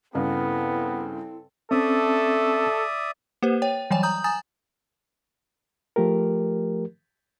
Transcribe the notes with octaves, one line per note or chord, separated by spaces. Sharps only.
G2 C#3 B3 C4 E4 A4
A3 C4 C#4 A4 D5 E5 D#6
A#3 G4 B4 C5
C#5 G5
E3 F#3 G3 C#5 G5 G#5
A#5 D#6 G6
G#5 A#5 D#6 A6
F3 A3 G4 A#4